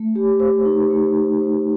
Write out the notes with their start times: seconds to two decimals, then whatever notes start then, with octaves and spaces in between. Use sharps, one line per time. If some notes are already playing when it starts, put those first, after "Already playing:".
Already playing: A3
0.15 G4
0.40 C5
0.65 D#4
0.90 A3
1.16 G4
1.40 C5